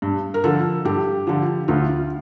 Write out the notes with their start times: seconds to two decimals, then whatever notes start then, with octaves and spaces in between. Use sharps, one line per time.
0.02 G2
0.34 A#4
0.44 D3 F3 A4
0.85 G2 G4
1.27 D3 F3
1.68 D2 F4